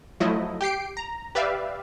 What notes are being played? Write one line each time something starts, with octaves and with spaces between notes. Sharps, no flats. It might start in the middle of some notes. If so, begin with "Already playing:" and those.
F3 F#3 A3 E4 D#5
G4 G5 C7 D7
A#5
G4 B4 D5 E5 F5